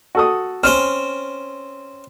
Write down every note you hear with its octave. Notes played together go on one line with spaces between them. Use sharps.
F#4 A4 D#6
C4 C#4 C5 F6